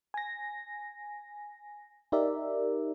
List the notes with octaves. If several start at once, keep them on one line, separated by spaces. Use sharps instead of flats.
G#5 A#6
D#4 G4 A#4 D5 E5